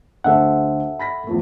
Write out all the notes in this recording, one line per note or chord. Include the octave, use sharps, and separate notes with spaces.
D2 D3 A4 C5 E5 F#5
B5 A#6 B6
E2 F3 A3